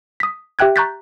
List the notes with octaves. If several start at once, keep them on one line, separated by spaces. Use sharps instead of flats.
D#6 B6
G4 E5 G5 F#6 G#6
A#5 C#6 F#6 G6 A6 B6